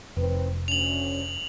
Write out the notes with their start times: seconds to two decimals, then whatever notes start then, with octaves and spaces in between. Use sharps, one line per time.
0.17 F1 D#3 C4 B4
0.68 D2 C#4 F7 F#7